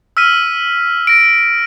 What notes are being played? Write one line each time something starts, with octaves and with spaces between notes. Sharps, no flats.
E6 F6 B6 D#7
A#6 D7